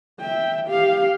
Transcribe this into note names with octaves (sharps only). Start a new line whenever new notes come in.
E5 G5
G4 F5